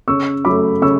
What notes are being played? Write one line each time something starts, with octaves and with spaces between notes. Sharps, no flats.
C#3 C#6 E6
F#3 A3 B5 D6
C#3 C#6 E6